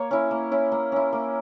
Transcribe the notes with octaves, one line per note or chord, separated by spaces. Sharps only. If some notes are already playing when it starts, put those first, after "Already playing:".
Already playing: A#3 C#5
C#4 E4
A#3
C#4 E4
A#3
C#4 E4
A#3